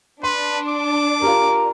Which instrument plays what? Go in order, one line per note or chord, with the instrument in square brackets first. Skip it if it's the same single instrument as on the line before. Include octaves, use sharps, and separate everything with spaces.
[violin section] D4 [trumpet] B4 [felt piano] C6
[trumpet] D6
[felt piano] F4 G4 [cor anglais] A#4